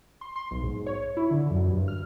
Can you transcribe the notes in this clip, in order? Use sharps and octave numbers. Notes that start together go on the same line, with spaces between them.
C6
C6
B1
G#2
C#5
E4
D3
F#2
G2
F6